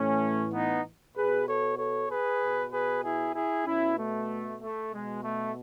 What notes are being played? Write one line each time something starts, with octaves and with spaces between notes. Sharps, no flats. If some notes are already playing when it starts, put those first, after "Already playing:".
Already playing: A2 E3 A3 C#4
B3 D#4
B2 G#4 B4
A4 C#5
A4 C#5
G#4 B4
B2
G#4 B4
E4 G#4
E4 G#4
B2 C#4 E4
A3
A3
B2 G#3
A3